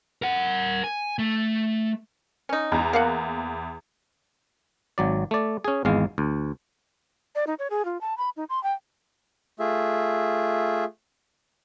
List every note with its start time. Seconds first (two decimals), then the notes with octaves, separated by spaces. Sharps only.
0.22 A#4 F#5
0.84 G#5
1.19 A3
2.49 C#4 D#4
2.72 E2 A#5
2.93 A#3 F5 F#5
4.98 G#1 F#3 D5
5.31 A3 D5
5.64 C#4 G#4
5.85 G#1 E2 G#3 F5
6.18 D2
7.35 D5
7.47 D#4
7.59 C#5
7.70 G#4
7.85 F4
8.01 A5
8.18 B5
8.37 D#4
8.49 C6
8.63 G5
9.60 A3 F4 G#4 E5